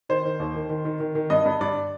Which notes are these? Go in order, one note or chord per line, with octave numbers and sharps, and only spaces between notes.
D#3 C5
D#3
D#2
D#3
D#3
D#3
D#3
D#3
G2 D#5
G2
G2 D5